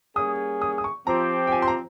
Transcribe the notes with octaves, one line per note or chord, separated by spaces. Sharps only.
G3 A#3 C#4 G#4 D#6
D#6
D#6
C#6
F3 C4 G4 A#5
G5
G#5
C6
A#5